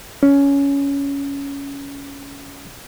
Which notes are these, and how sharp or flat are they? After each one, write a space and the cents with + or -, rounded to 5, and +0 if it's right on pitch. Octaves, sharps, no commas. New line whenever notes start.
C#4 +15